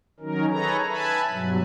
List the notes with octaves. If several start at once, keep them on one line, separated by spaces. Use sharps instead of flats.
D#3 F#3 C#4 D#4 A#4
G#4 A4 B4 C#5 A#5
B4 E5 G#5 A5 B5
G2 B2 F#3